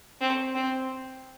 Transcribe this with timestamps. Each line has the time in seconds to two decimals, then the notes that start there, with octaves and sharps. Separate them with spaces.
0.21 C4
0.55 C4